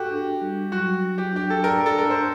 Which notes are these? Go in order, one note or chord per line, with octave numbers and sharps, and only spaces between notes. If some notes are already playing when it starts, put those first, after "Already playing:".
Already playing: F#4 G4 A4
D4
G3
F#3 F#4
F#3
G4
D4 G4
A4
A#4 D5
A4
D4 A#4
C5